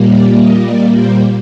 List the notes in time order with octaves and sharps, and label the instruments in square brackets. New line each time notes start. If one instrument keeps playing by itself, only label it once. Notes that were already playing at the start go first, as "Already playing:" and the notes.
Already playing: [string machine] A#2 G3 A#3
D5
D#5
D5
C5